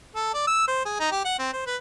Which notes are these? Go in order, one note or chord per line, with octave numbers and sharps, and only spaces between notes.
A4
D5
E6
C5
G#4
D#4
G4
F#5
C4
C5
B4